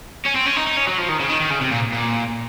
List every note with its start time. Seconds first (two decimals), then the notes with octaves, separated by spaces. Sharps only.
0.25 C#4
0.35 C4
0.46 C#4
0.56 D#4
0.67 D#4
0.77 C#4
0.87 F#3
0.98 F3
1.09 D#3
1.20 C#3
1.29 D#3
1.40 D#3
1.51 C#3
1.62 C3
1.72 A#2
1.93 A#2